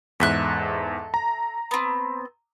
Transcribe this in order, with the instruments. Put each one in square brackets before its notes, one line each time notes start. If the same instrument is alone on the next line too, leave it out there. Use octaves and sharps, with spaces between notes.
[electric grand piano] E2 G#2 [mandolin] A4 E5 F#6
[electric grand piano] A#5
[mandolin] B3 C4